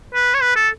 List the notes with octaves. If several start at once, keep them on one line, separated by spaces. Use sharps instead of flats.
B4
C#5
B4
A4